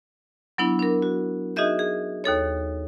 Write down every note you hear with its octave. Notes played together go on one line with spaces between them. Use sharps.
F#3 B3 D4 E4
D4 A#4
F#4
D#4 F#4 G#4 D#5 E5 G6
G#4
D#2 D#4 A4 C#5